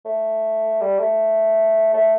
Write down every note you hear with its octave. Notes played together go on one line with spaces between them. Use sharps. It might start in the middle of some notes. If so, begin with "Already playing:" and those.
A3
G3
A3
A3